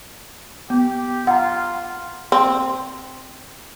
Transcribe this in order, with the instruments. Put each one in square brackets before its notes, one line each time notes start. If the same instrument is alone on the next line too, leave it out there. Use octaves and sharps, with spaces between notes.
[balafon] B3 [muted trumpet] G4
[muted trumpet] F4 [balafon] F#5 A#5
[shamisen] C4